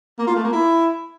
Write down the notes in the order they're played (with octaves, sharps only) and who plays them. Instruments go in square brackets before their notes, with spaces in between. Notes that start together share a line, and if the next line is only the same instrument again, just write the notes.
[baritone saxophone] A#3
F4
A3
A#3
E4